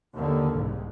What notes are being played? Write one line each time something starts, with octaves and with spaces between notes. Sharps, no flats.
D#2 D3
C2 G#2